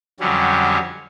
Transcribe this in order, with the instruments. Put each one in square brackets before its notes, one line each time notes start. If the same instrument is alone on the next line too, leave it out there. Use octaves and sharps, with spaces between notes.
[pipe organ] F2 D3 F#3 G3 C#4